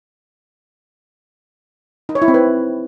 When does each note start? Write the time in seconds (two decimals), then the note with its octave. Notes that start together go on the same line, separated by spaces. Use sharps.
2.09 D#4
2.15 C#5
2.22 E4
2.28 C4
2.34 B4